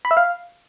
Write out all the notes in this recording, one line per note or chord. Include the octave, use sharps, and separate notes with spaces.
B5
E5
F5